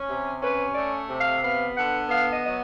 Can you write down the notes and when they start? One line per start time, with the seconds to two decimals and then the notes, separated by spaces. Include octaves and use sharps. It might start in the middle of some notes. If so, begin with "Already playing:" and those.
Already playing: C#4
0.08 C3
0.41 C#4 B4
0.75 A3 D5
1.09 C3
1.20 F5
1.37 E5
1.42 B3 F5
1.75 D3 F#5
2.09 B3 F5
2.30 D#5
2.43 F#3 D#5